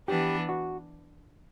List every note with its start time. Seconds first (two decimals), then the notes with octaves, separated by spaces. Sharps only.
0.08 E3 B3 D4 G4
0.49 F#4